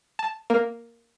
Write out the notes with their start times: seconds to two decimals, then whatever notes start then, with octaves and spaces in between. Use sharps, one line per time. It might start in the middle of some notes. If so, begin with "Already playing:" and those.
0.19 A5
0.50 A#3